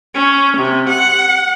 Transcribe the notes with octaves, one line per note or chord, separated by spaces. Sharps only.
C#4
C3
F#5